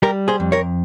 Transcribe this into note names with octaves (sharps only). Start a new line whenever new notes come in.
G3 G4 A#4
G#4 C5
F2
A#4 C#5